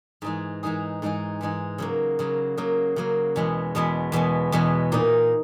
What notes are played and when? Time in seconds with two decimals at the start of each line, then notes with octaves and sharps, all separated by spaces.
0.22 G#2 E3 G#3 D#4 G#4
0.63 G#2 E3 G#3 D#4 G#4
1.02 G#2 E3 G#3 D#4 G#4
1.41 G#2 E3 G#3 D#4 G#4
1.78 C#3 F#3 A#3
2.19 C#3 F#3 A#3
2.58 C#3 F#3 A#3
2.96 C#3 F#3 A#3
3.36 E2 B2 G#3 B3
3.75 E2 B2 G#3 B3
4.12 E2 B2 G#3 B3
4.52 E2 B2 G#3 B3
4.92 A#2 A#3 D#4